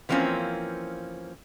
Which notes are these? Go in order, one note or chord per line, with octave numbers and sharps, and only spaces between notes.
E3 F3 A#3 C4 C#4